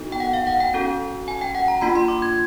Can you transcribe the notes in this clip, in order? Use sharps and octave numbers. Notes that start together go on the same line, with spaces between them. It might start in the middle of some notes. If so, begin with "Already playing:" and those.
Already playing: B3 D#4 F#4 A4
G5
F#5
F5
F#5
G5
C#4 F#4 A4
G#5
G5
F#5
A#5
A#3 D4 F4 B5
C6
D6
G#6